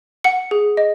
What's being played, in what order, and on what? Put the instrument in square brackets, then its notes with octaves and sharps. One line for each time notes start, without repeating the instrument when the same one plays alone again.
[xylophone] F#5 C#7
G#4
D#5